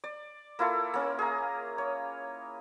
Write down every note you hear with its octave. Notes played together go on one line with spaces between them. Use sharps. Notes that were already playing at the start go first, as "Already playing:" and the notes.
D5
A#3 E4 F4 A4
A#3 C#4
G#4 A#5
C#5